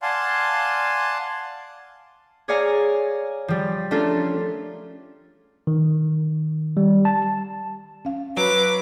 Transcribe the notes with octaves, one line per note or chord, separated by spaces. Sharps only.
D5 F5 F#5 G#5 A5 C6
G#4 C#5 D5 F5 G#5 A#5
F3 G3
A3 C#4 D4 F4 A4 A#4
D#3
G3
A5
C#4 F5
F#3 B4 D6